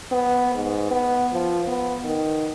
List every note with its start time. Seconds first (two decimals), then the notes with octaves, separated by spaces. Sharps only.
0.12 B3
0.54 G#2
0.91 B3
1.33 F3
1.68 B3
2.04 D#3